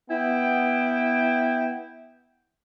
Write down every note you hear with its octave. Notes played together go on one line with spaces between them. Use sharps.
B3 E4 G5